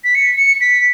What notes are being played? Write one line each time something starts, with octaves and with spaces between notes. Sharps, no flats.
B6
C#7
C#7
B6